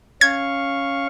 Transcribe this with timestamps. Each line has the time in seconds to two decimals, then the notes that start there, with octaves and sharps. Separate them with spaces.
0.21 C#4 F5 C#6 G#6